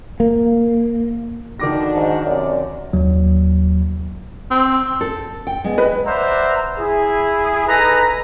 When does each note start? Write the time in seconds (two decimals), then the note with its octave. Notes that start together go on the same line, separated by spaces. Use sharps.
0.20 A#3
1.60 D3 D#3 D4 F#4 D6 A#6
1.94 G#2
2.25 F#2 C3 D5
2.93 D#2 F#3
4.51 C4
5.01 A4
5.47 G5
5.64 G#3 B3
5.78 B4 D#5
6.06 B4 C5 D5 E5 F#5 A#5
6.79 E4 G#4
7.68 D#4 A4 B4 G#5 A#5